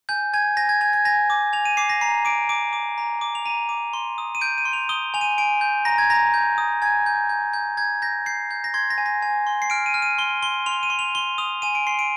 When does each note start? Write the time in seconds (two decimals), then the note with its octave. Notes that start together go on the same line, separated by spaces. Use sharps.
0.09 G#5 G6
0.34 G#5 G#6
0.57 G#5 A#6
0.69 G#6
0.81 G#5 G#6
0.93 G#6
1.05 G#5 A#6
1.30 D6
1.53 G#5 F7
1.65 D#7
1.77 D6 C7
1.89 A#6
2.01 A#5 C7
2.25 D6 D7
2.49 D6 D7
2.73 D6
2.98 A#5
3.21 D6
3.35 F7
3.46 A#5 D#7
3.69 D6
3.93 C6
4.18 D#6
4.35 D#7
4.41 G6 D7
4.58 D#7
4.65 C6
4.73 F7
4.89 D#6 G7
5.14 G#5 F7
5.21 D#7
5.38 G#5 D7
5.61 G6
5.85 A#5 A#6
5.98 G#6
6.10 A#5 A#6
6.34 G6
6.58 D#6
6.82 G#5 G#6
7.06 G6
7.29 G6
7.53 G6
7.77 G6 G#6
8.02 G6 A#6
8.26 G6 C7
8.51 G6
8.64 A#6
8.74 C6 G#6
8.90 A#6
8.98 G#5
9.06 A#6
9.22 G#5
9.47 C6
9.62 C7
9.70 F6 D7
9.86 D#7
9.94 F6
10.02 D#7
10.18 C6 G7
10.42 C6 G7
10.66 C6 F7
10.83 D#7
10.90 C6
10.99 F7
11.15 C6 G7
11.38 D#6 F7
11.62 G#5 D#7
11.75 D7
11.87 C6 C7
11.99 D7